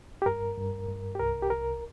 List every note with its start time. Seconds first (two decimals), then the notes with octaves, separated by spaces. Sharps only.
0.22 G4
0.26 G2 A#4
0.58 G2
0.89 G2
1.15 G4
1.19 C2 A#4
1.42 G4
1.50 C2 A#4